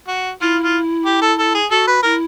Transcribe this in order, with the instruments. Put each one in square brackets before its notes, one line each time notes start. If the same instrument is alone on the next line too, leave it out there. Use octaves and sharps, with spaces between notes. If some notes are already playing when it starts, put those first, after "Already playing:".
[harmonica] F#4
[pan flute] E4 [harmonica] F4
[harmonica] F4
G4
A4
A4
G#4
[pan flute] F#4 [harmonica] A4
[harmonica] B4
[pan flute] E4 [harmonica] A#4